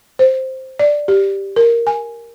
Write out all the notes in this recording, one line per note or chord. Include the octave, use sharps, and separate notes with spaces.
C5
D5
G4
A#4
G#5